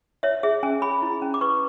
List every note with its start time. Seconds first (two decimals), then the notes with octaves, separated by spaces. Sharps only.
0.23 C#5 E5
0.43 G#4 E5
0.63 C#4 G#5
0.82 G#4 B5
1.02 E4
1.22 C#4
1.34 D6
1.41 B4 C#6